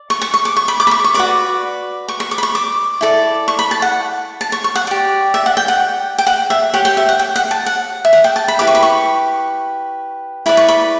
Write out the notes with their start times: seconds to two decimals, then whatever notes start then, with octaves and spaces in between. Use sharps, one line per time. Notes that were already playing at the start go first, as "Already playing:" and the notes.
Already playing: D5
0.10 C#6
0.22 C#6
0.34 C#6
0.45 D6
0.57 C#6
0.68 B5
0.80 D6
0.87 B5
0.91 C#6
1.04 C#6
1.14 F#4 B4 D5 D6
2.08 C#6
2.20 C#6
2.31 D6
2.38 B5
2.43 C#6
2.55 D6
3.01 E4 A4 D5
3.48 C#6
3.59 B5
3.71 A5
3.82 F#5
4.41 A5
4.52 C#6
4.64 C#6
4.76 F#5
4.87 G4 D5
5.34 E5
5.46 F#5
5.57 G5
5.68 F#5
6.18 G5
6.27 F#5
6.50 E5
6.74 G4 C#5 F#5
6.85 G5
6.97 E5
7.09 F#5
7.19 G5
7.36 F#5
7.51 A5
7.66 F#5
8.05 E5
8.13 F#5
8.24 G5
8.36 A5
8.48 B5
8.59 E4 G4 B4 D6
8.67 C#6
8.75 B5
8.83 C#6
10.46 E4 B4 D5 B5
10.57 C#6
10.69 B5